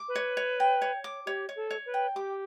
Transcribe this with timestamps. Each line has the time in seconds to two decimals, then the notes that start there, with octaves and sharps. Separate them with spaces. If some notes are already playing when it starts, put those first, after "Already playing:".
Already playing: D6
0.08 B4
0.15 C#5
0.37 C#5
0.60 G5
0.82 C#5
1.04 D6
1.26 G4 C#5
1.49 C#5
1.56 A4
1.71 C#5
1.86 B4
1.94 G5
2.15 G4 D6